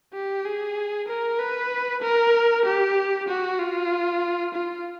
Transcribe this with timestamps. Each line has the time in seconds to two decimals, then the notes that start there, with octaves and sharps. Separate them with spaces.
0.14 G4
0.45 G#4
1.08 A#4
1.39 B4
2.02 A#4
2.65 G4
3.28 F#4
3.59 F4
4.54 F4